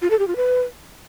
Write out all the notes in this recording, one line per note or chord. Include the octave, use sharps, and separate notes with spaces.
F4
A4
G4
F4
B4